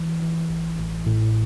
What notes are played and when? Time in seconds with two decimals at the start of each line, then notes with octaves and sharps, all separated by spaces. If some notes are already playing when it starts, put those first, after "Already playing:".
Already playing: E3
0.22 E3
0.50 A1
0.78 A1
1.06 A2